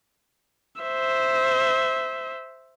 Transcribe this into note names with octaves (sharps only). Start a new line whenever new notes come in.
C5 E5